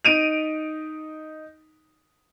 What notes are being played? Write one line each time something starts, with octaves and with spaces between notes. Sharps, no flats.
D#4 D7 D#7 F7